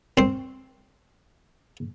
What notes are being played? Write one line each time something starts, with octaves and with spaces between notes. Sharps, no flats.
C4 C5